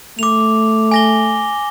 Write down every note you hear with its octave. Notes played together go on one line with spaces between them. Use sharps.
A3 D6 F7
G#5 A#6 G7